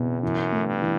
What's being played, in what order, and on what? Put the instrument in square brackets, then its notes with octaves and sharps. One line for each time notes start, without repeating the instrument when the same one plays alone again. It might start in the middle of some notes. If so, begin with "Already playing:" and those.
Already playing: [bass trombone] E2 [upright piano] B2
[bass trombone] F#2 [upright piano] E3
[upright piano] A3
[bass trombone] G2
[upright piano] E3